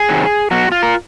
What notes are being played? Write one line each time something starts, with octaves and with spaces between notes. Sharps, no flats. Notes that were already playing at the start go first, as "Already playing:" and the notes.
Already playing: G#4
C3 D#3 F#3
B2 F#3 F#4
F4
A#4